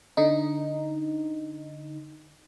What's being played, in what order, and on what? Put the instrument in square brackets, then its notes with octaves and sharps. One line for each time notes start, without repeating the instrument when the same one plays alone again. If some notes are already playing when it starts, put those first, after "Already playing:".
[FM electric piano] D3 D#4